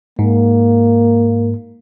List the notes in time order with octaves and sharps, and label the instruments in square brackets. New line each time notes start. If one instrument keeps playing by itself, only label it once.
[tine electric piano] G#2 [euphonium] A#3